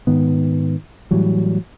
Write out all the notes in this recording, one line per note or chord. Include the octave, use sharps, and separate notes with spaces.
G#2 D#3 B3
A2 E3 F#3 G3